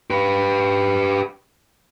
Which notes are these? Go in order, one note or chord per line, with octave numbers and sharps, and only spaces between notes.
G4 B4